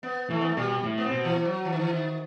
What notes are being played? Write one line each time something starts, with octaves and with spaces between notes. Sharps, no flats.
B3
E3 A3
B3
A3
B2 G3
A2
B3
C4
B2
E3
F#3
E3
D#3
E3
D#3